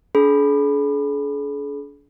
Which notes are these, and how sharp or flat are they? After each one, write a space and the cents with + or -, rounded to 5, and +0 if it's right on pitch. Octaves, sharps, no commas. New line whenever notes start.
D4 -35 G#4 +45 B5 +0